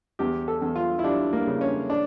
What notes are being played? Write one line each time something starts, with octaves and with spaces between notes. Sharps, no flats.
E2 G4
A4
E2
F4
E4
G3 D4
A#3
C#3
C#4
D4